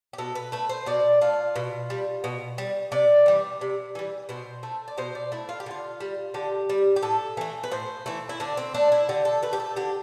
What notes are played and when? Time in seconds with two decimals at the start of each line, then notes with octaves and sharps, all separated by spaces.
0.13 G4
0.18 B2 A4
0.35 B4
0.52 A3 B4
0.69 C5
0.86 B2 D5
1.21 A3 F4
1.56 B2
1.90 G3
2.24 B2
2.58 G3
2.92 C3 D5
3.26 E3 G3
3.61 C3
3.95 E3 G3
4.29 B2 C5
4.63 A3
4.88 D5
4.98 B2 C5
5.15 D5
5.32 A3 E4
5.49 F4
5.60 G4
5.66 D3 F4
6.00 G3
6.34 D3 G4
6.69 G3
6.96 G4
7.02 A2 A4
7.37 E3 A3
7.63 B4
7.71 A2 C5
8.06 E3 A3
8.29 E4
8.40 D3 D4
8.57 C4
8.74 A3 D4
8.92 E4
9.09 D3 G4
9.25 A4
9.43 A3 B4
9.53 G4
9.60 A4
9.76 D3 G4